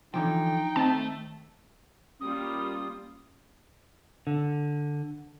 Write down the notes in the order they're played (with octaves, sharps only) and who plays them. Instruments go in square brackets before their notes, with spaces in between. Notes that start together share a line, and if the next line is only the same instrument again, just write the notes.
[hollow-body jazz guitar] D3 E3 F3 [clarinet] D#4 [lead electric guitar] G5
[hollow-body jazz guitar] D#3 [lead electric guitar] A3 [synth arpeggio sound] C4 A5
[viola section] G3 A#3 F4 [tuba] C#4 [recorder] D#6
[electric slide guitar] D3